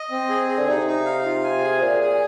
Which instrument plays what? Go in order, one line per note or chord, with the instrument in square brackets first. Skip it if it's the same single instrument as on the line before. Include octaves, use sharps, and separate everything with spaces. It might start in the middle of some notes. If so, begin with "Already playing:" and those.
Already playing: [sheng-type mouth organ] D#5
C4
G#4
G#4
[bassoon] D3
[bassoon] C3 [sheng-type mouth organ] D#4
[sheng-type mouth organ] D#4
F5
F4
G#5
G#4
[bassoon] A#2 [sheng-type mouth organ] G#4
[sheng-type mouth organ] G#4